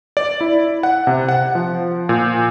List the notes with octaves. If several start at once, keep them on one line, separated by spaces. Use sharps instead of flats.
D5
E4
F#5
C3
F#5
F3
A#2